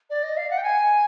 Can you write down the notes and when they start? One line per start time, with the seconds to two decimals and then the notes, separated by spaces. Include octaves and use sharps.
0.10 D5
0.23 D#5
0.37 F5
0.50 F#5
0.57 G5
0.63 G#5